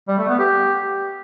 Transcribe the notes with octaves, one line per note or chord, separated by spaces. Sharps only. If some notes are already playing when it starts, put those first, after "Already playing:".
G3
A3
B3
G4